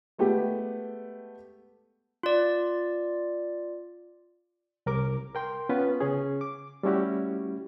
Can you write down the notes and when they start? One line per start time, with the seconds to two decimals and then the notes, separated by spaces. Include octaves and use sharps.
0.18 G#3 A3 B3 G4
2.23 F4 D5
4.86 C2 A#4 D6
5.35 A#4 G5 C6
5.69 B3 C#4 F4 B4
6.00 C#3 C#4 G#4
6.41 D6
6.83 G3 A3 C#4 E4 F#4 G4